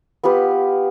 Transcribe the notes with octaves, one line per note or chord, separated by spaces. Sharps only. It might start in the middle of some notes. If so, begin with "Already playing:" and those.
B3 F4 G4 B4